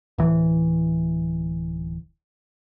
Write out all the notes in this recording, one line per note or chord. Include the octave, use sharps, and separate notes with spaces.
D1 E3